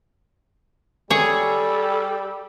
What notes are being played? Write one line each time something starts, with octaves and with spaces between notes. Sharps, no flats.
G3 G#4 A4 C#5